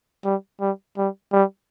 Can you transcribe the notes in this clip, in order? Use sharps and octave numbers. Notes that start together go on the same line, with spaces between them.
G3
G3
G3
G3